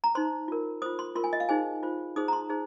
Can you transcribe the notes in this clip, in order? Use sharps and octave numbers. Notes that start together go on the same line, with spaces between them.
A#5
D#4 C5 C6
F4 A#4
F4 C5 D#6
C6
F4 A#4 C6
G#5
D#5
F5
D#4 G#4 C5 G#5
F4 C5
D#4 G#4 C5 D#6
A#5
C6
D#4 G#4 C5